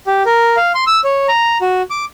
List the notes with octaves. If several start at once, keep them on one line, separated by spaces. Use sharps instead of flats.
G4
A#4
F5
C6
E6
C#5
A#5
F#4
D6